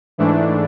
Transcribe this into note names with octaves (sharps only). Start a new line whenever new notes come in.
G#2 E3 A3 D4